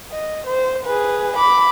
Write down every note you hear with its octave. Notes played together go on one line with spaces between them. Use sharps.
D#5
C5
G#4 B4
B5 D6